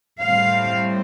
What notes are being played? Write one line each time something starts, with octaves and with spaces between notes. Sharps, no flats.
A2 G3 C4 F5